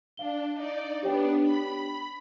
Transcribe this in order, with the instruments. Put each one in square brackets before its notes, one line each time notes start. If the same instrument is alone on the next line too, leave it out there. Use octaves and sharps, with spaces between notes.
[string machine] D4 [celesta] F5 G7
[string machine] D#4 D5
[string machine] B3 D4 [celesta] G4 C#5 G5
[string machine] B5